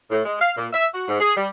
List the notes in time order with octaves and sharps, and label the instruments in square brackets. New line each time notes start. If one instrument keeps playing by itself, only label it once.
[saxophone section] A2
G#3
F5
A#2
E5
F#4
G#2
G#4
G3